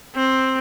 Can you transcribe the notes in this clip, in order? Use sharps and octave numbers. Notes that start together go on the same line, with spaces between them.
C4